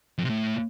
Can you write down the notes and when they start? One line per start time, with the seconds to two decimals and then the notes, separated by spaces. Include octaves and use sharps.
0.18 F2
0.24 C3
0.30 A2